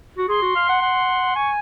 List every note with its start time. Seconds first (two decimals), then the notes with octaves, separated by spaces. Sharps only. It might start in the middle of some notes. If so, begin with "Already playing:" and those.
0.18 F#4
0.29 G#4 C6
0.42 F#4
0.56 F5
0.69 F#5
0.82 F#5
1.36 G#5 C#6